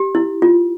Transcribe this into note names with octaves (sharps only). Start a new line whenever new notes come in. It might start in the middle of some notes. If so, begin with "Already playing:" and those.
Already playing: G4
E4
F4